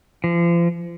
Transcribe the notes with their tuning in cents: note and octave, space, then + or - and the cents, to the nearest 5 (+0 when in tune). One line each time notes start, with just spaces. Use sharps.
F3 -35